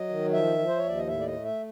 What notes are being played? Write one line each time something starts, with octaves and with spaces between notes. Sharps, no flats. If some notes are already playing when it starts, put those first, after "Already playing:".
Already playing: F#3 D#5
D#3
F3 E5
F3
C5
C#5
D#2 D5
D#5
A2 E5
D5
D#5
A3
E5